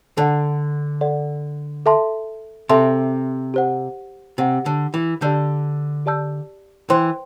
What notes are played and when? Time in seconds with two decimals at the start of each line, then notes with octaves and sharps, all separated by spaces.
0.17 D3 A4 D5 F#5
1.01 A4 D5 F#5
1.86 A4 E5 A5 C6
2.69 C3 A4 E5 A5 C6
3.54 G4 C5 F#5
4.38 C3 G4 C5 F#5
4.66 D3
4.94 E3
5.22 D3 G4 D5 A5 E6 G6
6.06 G4 D5 A5 E6 G6
6.90 E3 C5 G5 C6